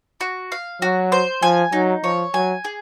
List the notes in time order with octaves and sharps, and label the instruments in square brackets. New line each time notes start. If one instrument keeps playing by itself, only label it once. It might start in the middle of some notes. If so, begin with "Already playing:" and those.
[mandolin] F#4
F5
[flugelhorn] F#3 [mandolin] F#4
[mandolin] C5
[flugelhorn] F3 [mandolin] G#5
[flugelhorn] F#3 [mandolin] D#4
[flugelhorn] F3 [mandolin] C#5
[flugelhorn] F#3 [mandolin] G#5
[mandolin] G#4